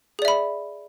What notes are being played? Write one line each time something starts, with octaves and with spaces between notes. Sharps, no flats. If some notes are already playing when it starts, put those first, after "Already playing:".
G#4 D5 E5 B5